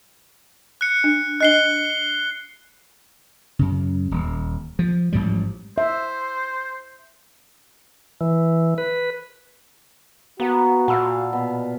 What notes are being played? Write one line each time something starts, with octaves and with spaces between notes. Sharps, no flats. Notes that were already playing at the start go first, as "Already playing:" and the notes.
F#6 C#7
D4
D4 D#5 F#6 C7 G7
F#2 C#3
D#1
F3
A1 G#2 F3 G3
C5 E5
E3
B4
A#3 B3 F#4
A#2 F5 F#5 A5 B5 E6
B2